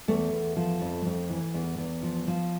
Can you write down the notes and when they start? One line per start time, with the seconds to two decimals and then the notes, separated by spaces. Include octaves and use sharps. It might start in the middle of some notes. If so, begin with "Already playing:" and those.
0.08 E2 A3
0.33 E2
0.56 F3
0.81 F2
1.05 F2
1.30 E3
1.54 E2
1.78 E2
2.03 F3
2.28 F3